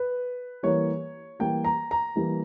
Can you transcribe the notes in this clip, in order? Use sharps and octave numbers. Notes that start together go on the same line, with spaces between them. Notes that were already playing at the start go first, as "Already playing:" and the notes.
Already playing: B4
E3 G3 A#3 C#5
E3 G3 A#3 G5
A#5
A#5
E3 G3 A#3